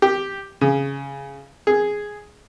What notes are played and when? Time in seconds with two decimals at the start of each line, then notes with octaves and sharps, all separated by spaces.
0.02 G4
0.61 C#3
1.67 G#4